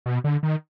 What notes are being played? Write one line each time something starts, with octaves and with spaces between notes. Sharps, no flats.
B2
D3
D#3